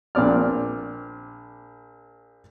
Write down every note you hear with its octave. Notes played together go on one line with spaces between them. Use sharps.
A#1 C4 D5 F6